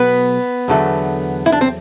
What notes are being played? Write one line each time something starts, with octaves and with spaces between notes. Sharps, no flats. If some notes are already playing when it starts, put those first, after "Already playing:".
Already playing: B1 B2 B3 B4
E2 D3 F#3 A3
E4
D4
C4